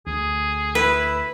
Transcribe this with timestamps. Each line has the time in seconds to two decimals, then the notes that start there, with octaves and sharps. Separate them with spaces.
0.07 D2 G#4
0.75 E4 B4